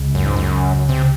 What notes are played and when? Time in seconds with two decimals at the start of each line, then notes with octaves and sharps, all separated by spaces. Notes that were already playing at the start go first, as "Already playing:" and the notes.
Already playing: C#2 C#3 G#3
0.15 F#2
0.25 G#2
0.36 F#2
0.89 C3